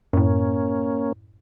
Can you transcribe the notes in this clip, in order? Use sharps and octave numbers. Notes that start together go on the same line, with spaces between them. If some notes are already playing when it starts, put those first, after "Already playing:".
F#2 A2 A#3 C#4